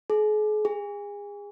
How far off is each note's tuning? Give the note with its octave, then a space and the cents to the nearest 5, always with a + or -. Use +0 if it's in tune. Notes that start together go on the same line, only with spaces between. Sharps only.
G#4 +40
G#4 -30